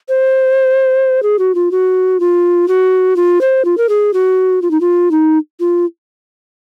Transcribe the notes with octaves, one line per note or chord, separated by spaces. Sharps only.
C5
G#4
F#4
F4
F#4
F4
F#4
F4
C5
F4
A#4
G#4
F#4
F4
D#4
F4
D#4
F4